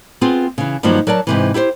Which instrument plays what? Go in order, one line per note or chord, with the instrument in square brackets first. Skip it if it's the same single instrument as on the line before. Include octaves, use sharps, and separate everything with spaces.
[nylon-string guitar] B3 C4 F4 G#4
C#3 E3
G2 D#3 F3 F#3 A#3
F#3 A#4 D5 A5
G#2 C3 E3
E4 G4 A#4 C5